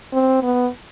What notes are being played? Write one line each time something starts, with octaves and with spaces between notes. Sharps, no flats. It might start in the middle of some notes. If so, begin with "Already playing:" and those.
C4
B3